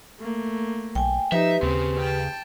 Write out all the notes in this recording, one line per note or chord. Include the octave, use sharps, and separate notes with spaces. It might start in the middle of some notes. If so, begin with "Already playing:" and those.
A3 A#3
B1 G5 G#5
F3 D#4 G4 B4 E5
D#2 C#3 C4
G5 A5